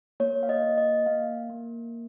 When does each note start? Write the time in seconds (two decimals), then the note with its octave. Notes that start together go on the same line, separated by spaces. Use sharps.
0.20 A#3 C#5
0.43 F5
0.49 D#5
0.64 A#3
0.77 D#5
1.06 A#3 F5
1.50 A#3